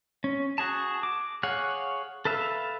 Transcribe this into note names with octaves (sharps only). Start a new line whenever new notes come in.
C#4
F#4 G#4 A5
D6
G#4 C#5 F5 F#5
A4 B4 E5 F5